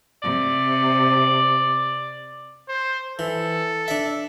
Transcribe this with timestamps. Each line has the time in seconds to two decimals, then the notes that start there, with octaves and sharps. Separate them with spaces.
0.22 C3 D5
2.68 C5
3.19 E3 A4
3.88 D4 E5